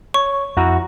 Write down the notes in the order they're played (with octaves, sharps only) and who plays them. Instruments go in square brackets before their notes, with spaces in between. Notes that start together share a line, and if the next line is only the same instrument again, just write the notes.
[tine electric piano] C#5 [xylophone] C#6
[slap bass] F2 [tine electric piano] E4 F#4 A#5